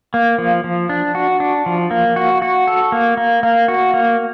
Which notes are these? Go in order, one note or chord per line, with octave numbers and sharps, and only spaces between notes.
A#3
F3
F3
D4
F#4
D4
F3
A#3
F#4
F#4
A4
A#3
A#3
A#3
F#4
A#3